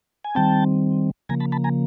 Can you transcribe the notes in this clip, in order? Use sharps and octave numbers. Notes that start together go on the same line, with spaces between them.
G#5
D#3 G3 C4 G5 A5
C#3 F3 A#3 G#5 A#5
A5 B5
A5 B5
G#5 A#5